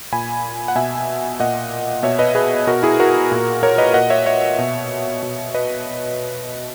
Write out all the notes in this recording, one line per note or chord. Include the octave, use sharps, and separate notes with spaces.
A#2 G#5 B5
F#5
B2 E5 G#5
A#2 D#5 F#5
B2 C#5 E5
B4 D#5
G#4 B4
B2 F#4 A#4
E4 G#4
F#4 A#4
A#2
A#4 C#5
B4 D#5
A#2 D#5 F#5
C#5 E5
C#5 E5
B2
B2
B4 D#5